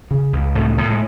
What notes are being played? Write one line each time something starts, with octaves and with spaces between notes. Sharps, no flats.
C#3
C#2
A2 A3
A2
G#3